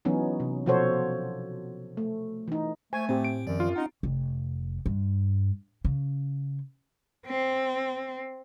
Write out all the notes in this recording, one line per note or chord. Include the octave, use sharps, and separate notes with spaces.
E3 F#3 B3 C#4 D#4
C3
B2 F3 F#4 A4 C5 C#5
A3
E3 D#4
A3 C5 G#5 C#6 G#6
A2 C4 G4
D7
F#2 D#3 F3 D5
F4
C#4 D#4 D#5 F#5
F1
G2
C#3
C4